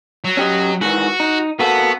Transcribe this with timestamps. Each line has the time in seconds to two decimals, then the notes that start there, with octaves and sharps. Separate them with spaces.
0.24 F#3
0.37 C#4 G4 D#5
0.81 G#2 D#3 E3 F#4
1.20 D#4
1.59 A#3 B3 F#4 A4